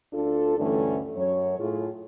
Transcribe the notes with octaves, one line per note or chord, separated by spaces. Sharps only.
D2 D4 F4 A4
D2 G2 D3 E3 A3 C#4
F#2 F#3 C#5
A2 F4 G#4